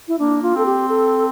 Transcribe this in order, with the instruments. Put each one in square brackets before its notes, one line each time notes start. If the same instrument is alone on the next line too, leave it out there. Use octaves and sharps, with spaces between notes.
[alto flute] E4
[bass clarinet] A#3 [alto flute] D4
[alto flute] F4
[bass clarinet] C4 [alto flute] A4
[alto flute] G4
A4